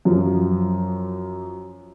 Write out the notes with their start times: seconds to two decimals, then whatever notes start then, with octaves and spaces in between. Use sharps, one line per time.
0.05 F#2 F3